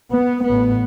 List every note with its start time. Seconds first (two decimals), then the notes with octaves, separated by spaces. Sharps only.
0.10 B3
0.45 A1 A2 B3